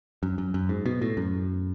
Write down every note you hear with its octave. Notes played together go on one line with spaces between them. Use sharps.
F#2
F#2
F#2
G#2
B2
A2
F#2